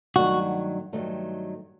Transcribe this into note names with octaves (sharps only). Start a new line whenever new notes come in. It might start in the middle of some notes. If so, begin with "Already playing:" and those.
G2 D#3 F#3 A3 F#4
G2 D#3 F#3 A3